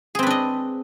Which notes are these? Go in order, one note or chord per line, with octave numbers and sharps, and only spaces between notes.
C4 D4 G#4 B4 D#5